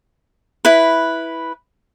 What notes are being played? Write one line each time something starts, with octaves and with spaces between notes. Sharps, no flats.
E4 B4